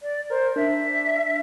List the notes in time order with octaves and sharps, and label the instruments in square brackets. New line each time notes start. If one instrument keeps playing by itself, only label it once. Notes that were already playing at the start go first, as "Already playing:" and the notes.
[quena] D5
[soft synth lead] A#4 [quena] C5
[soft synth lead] D4 [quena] E5